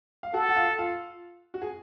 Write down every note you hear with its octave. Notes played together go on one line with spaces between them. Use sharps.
F5
F#4 A4 F#5
F#5
F4 F5
F4 F5
F#4
G#4